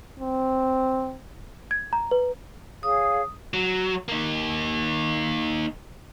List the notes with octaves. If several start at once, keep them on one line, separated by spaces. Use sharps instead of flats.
C4
G#6
A#5
B4
G#4 C#5 F5 D#6
F#3
A#3 D#4